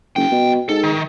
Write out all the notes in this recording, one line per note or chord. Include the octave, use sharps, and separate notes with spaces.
F#1 C2 G5
B2
G#2 A4
D#3